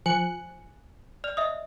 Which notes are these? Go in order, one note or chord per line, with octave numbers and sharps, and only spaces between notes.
F3 G#5 F#6 C#7
D5 F6 F7
D#5 E5 D#6